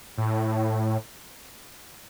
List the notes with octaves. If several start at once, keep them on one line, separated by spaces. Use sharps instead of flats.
A2